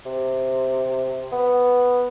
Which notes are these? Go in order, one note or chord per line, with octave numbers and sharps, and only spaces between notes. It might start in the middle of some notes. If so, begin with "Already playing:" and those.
C3
B3